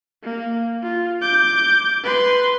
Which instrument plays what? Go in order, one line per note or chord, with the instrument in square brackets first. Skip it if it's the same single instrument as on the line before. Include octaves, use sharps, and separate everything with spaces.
[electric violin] A#3
F4
D6 G6
B4 C6